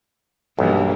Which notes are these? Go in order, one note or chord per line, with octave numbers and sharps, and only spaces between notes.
B1 G2 E3 A#3